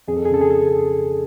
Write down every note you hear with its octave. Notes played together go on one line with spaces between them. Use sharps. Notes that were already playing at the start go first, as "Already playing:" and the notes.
F2 G#4
A4
G#4
C#3 A4
G#4
A4